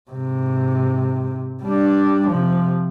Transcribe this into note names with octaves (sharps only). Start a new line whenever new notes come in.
G#2 C3
G3 D4
C3 F3